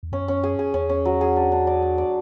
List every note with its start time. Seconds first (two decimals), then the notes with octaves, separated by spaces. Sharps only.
0.03 E2
0.12 F#2 C#4
0.28 C#4
0.43 G#4
0.59 G#4
0.74 E2 C#4
0.89 C#4
1.05 F#3
1.21 G#4
1.36 D4
1.52 D4
1.67 D5
1.82 D4
1.98 D5